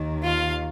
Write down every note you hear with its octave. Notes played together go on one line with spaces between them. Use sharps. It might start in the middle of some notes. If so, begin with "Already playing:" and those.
Already playing: D#2 D#3
F4 F5